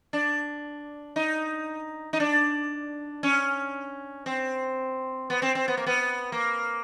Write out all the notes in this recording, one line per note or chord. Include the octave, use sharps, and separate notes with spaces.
D4
D#4
D#4
D4
C#4
C4
B3
C4
C4
B3
A#3
B3
A#3